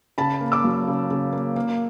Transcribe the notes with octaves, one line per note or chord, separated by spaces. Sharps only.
C#3 A5 B5
A#3
D6 E6
F#3
C#3
C#3
A#3
A#3